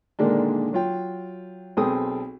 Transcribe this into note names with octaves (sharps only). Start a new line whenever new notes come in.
A#2 D3 D#3 G#3 A#3 D4
F#3 F4 G5
B1 C4 G#4 A4 G5 D#6